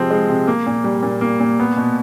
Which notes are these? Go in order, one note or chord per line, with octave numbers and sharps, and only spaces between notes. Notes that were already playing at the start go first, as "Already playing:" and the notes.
Already playing: C3 F3 G#3 C4
G#3
C3
A#3
A#2
G3
A#2
A#3
A#2
B3
B2